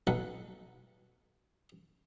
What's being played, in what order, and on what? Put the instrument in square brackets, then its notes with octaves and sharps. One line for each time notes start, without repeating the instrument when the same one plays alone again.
[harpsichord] B1 B4 F#5